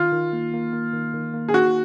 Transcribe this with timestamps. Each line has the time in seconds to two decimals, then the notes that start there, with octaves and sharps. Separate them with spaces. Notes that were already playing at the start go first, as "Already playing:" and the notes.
Already playing: D#3 F4
0.12 D#3
0.33 A#3
0.53 A#3
0.73 A#3
0.93 D#3
1.14 D#3
1.34 A#3
1.49 G#4
1.54 D#4 F#4